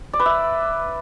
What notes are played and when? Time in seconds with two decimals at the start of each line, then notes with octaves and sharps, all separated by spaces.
0.13 D5
0.19 B4
0.26 E5